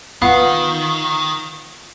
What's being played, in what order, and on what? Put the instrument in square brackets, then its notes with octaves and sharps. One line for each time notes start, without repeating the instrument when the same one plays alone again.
[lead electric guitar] D#3 [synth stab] B3 [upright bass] F4 [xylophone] F5 F#5